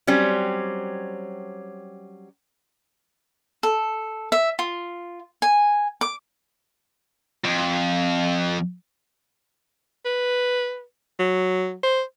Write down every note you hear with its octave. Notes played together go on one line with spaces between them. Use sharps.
F#3 G3 C4 C#4
A4
E5
F4
G#5
D6
F2
B4
F#3
C5